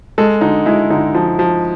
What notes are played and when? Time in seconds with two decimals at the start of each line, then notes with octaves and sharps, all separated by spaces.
0.18 G#3 A4
0.41 D3 D#4
0.66 G#3 E4
0.90 D3 D#4
1.15 F3
1.39 F3